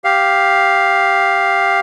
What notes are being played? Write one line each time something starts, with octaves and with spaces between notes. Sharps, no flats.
G4 F5